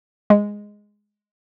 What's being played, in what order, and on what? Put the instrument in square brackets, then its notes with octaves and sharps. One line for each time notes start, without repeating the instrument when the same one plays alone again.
[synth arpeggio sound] G#3